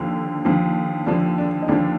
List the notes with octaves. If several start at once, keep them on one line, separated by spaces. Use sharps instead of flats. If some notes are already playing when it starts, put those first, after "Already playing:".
Already playing: D#2 D3 F3
D#2 D3 F3
D#2 D3 F3 D4
D4
D#4
D#2 D3 F3 D4